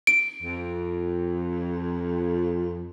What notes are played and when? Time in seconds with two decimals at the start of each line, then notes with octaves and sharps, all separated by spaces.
0.07 D7
0.43 F2